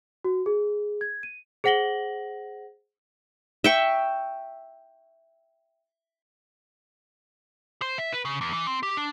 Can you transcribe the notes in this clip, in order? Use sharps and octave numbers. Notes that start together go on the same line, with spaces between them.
F#4
G#4
G#6
D#7
G#4 C5 F#5 A#6 F#7 G7
E5 G5 C#6
C5
E5
B4
C#3
E2
E3
C4
G4
D4